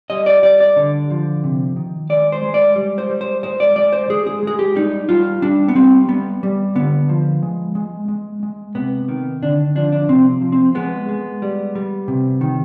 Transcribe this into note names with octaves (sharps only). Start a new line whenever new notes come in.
G3 D#5
D5
G3 D5
D5
D3
F3
C3
D#3
G#3 D5
C5
G#3
D5
G3
C5
G3
C5
G#3 C5
D5
G#3 D5
C5
G#3 G#4
G#4
G#3 G#4
G4
G3 D#4
G3 F4
G3 D4
B3
G3 C4
G3 B3
G3
D3 B3
F3
G#3
G#3
G#3
G#3
C3 B3
D#3
D3 D4
F3 D4
D4
C3 C4
F3
C4
G#3 B3
G#3
G3
G3
C3
D#3